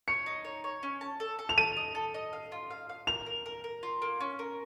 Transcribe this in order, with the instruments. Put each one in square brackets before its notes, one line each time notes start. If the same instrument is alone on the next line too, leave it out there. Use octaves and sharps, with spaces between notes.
[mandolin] C#5 [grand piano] C#7
[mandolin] D#4
C#5
C#5
C#4
A5
A4
A4
[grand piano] F7
[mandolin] A4 [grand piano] D#7
[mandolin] D#5
A4
D#5
F5
F4
F5
F5
[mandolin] A#4 [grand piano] F7
[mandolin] A#4
A#4
A#4
F4
A#3
C#4
A#4